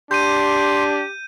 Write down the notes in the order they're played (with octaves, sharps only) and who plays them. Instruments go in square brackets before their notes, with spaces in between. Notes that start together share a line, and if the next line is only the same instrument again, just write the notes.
[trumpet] D4 [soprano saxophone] G4 [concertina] C6 [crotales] G6 D#7